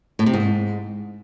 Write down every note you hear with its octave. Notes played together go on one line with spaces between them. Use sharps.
A2
C3
G#2